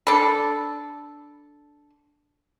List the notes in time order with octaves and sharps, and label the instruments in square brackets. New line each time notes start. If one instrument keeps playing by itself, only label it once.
[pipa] D4 A4 [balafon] B5